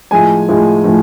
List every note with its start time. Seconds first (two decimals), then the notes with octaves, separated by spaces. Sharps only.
0.11 A2 F3 G#3 G#5
0.48 A2 F3 G#3
0.84 A2 F3